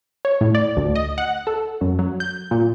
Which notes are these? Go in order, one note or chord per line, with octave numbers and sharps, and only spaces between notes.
C#5
A2
D5
D2
D#5
F#5
A4
F#2
F#3
G6
A#2